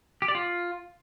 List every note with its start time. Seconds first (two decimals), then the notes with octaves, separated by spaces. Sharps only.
0.22 G4
0.28 D5
0.35 F4